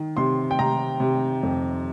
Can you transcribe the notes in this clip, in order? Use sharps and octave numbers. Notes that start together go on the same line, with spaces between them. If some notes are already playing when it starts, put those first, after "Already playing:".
Already playing: D#3
C3 C6
G5
C3 A#5
C3
F2